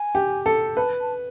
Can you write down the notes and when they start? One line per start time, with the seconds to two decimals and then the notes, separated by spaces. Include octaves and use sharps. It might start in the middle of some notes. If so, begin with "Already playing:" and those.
Already playing: G#5
0.15 G4
0.46 A4
0.77 B4 A5
1.01 A5